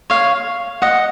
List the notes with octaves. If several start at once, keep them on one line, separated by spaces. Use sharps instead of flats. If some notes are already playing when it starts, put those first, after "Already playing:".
C#5 F5
D#5 F#5